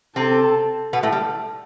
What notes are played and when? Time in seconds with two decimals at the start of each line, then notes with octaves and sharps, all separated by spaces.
0.16 C3 C4 A4
0.93 B2 B3
1.03 A2 A3
1.13 G3